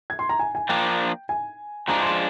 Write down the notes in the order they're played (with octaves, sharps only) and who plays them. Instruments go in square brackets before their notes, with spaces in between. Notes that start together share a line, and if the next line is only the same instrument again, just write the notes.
[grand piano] G#6
C6
A#5
G#5
G#5
[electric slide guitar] F3 A#3 D4 [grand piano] G5
[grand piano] G#5
[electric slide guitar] F3 G#3 D4 [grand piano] A#5
[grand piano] C6